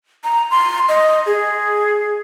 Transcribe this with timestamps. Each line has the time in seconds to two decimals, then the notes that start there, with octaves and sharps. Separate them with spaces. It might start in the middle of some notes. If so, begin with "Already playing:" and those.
0.24 A#5
0.51 C6
0.89 D#5
1.26 G#4